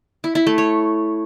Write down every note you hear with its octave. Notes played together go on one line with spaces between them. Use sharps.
E4
E4
A3
C#5